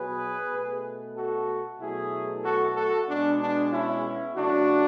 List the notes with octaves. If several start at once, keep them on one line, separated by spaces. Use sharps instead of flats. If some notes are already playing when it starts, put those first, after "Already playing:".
Already playing: B2 F#3 B3 G#4 B4
B2 A3
F#4 A4
B2 F#3 A3 E4 G#4
F#4 A4
F#4 A4
B2 G#3 B3 D4
D4
C#4 E4
C#3 F#3 A3 D4 F#4